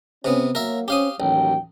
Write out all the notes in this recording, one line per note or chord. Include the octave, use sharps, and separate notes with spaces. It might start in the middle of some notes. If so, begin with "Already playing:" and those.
C3 B3 C#4
F#3 A#3 A#4 E5
C4 C#4 G4 F5 D#6
A1 D#2 F#3 G5